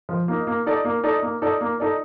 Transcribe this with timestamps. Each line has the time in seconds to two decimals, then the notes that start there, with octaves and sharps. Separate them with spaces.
0.09 F3
0.28 A#3 D#4
0.47 A#3
0.66 D#4 A4 D5
0.85 A#3
1.03 D#4 A4 D5
1.22 A#3
1.42 D#4 A4 D5
1.61 A#3
1.80 D#4 A4 D5